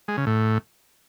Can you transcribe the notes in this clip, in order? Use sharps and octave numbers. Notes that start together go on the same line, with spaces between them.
G#3
C#3
A2